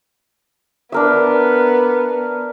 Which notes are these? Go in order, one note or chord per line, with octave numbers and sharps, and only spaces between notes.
B3 D4 A#4 E5